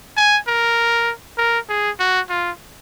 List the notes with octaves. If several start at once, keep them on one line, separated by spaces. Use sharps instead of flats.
G#5
A#4
A#4
G#4
F#4
F4